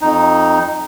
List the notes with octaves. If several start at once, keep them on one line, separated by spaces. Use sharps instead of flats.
F2 D#4